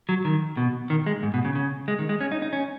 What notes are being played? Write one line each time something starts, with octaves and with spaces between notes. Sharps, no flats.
F#3
D#3
B2
D#3
G#3
G#2
B2
C#3
C#3
G#3
D#3
G#3
C#4
D#4
D#4
C#4